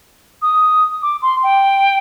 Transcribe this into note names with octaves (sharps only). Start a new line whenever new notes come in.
D#6
D6
C6
G5